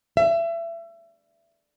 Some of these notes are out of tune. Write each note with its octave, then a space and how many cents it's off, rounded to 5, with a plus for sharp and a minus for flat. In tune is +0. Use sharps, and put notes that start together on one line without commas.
E5 +30